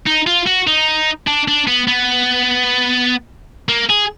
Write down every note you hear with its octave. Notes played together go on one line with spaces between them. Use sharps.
D#4
F4
F#4
D#4
D4
D4
B3
B3
A#3
G#4